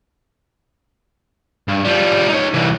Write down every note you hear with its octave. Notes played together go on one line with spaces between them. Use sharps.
G2
F3 G3
D#4 C#5
C2 E3